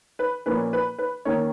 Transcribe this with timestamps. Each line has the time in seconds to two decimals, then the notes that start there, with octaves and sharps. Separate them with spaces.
0.19 B4
0.46 A#2 F3 A#3 C#4 B4
0.73 B4
0.98 B4
1.25 D#3 A#3 C#4 C#5